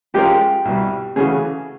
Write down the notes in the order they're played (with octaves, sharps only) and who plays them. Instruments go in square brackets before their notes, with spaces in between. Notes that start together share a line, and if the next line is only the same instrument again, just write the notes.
[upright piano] F3 G#3 C#4 F4 A#4 [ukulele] G4
[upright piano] C2 B2 G3
[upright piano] C#3 E3 A3 C#4 F#4 [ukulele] G#4